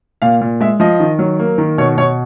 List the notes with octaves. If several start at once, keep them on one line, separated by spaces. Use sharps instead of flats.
A#2 F5
A#2
G#3 E5
F3 D#5
D#3
F#3
A#3
D#3
B2 C#5
B2 C#5